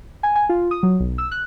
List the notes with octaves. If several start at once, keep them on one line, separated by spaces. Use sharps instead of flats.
G#5
G#5
F4
D#6
F#3
B1
E6
F#6